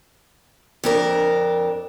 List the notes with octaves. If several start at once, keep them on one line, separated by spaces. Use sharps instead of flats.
F2 D4 A#4